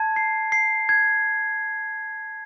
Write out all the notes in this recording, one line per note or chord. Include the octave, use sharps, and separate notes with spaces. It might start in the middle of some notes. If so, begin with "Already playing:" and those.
Already playing: A5 G#6
C7
C7
G#6